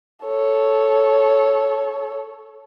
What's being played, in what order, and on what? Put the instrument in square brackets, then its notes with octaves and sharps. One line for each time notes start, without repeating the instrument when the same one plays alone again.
[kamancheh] A4 C#5